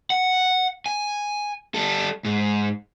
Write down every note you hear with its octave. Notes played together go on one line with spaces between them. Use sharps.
F#5
G#5
G3 A4
G#2